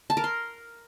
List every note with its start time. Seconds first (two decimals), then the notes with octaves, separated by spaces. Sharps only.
0.10 A5
0.17 A#4
0.24 C6